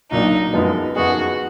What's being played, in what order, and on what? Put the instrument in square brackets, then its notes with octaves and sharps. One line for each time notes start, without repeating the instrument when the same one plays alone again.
[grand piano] B1 A#2 F#3 D4 [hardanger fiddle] D#4
[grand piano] F#2 F3 G#3 B3
[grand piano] F#2 F3 B3 D#4 G#4 [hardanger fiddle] F#4